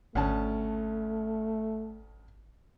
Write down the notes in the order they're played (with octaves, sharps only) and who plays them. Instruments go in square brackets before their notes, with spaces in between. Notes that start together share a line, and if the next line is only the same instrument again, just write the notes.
[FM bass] G#1 [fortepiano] D2 C#4 A5 [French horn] A3